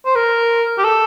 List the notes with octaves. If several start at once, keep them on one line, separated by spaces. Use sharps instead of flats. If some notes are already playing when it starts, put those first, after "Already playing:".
C5
A#4
G4
A4